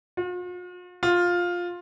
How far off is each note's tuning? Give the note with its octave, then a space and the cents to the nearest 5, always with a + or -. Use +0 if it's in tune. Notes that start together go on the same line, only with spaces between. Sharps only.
F4 +45
F4 +10